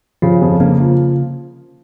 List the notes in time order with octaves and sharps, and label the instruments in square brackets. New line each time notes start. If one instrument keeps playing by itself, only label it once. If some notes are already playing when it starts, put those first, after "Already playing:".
[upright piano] C#3 [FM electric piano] F3
[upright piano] F2
[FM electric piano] C#3 [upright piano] A#3
[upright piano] F3